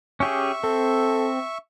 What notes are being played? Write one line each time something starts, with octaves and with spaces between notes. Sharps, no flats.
C#4 G4 G#4 E5 C#6
C4 A4